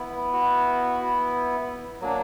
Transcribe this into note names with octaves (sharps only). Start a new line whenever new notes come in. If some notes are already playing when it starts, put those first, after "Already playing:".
Already playing: B3 E4
F#4
F#3 A#3 D4